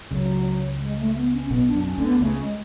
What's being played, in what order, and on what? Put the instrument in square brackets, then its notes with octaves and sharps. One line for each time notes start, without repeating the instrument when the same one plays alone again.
[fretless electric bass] C#2 C#3 [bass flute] F#3
[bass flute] G#3
A3
B3
C#4
[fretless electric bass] B1 B2 [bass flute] B3
[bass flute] D4
[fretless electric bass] F#2
[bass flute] C#4
[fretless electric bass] D2 D3
[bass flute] B3
[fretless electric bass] C#2 C#3 [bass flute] A3
[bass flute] G#3